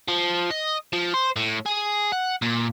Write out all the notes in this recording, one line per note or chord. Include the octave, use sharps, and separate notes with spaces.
F3
D#5
F3
C5
A2
G#4
F#5
A#2